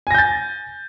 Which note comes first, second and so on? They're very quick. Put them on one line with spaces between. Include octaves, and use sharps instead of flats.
G#5 A#6 G6 A6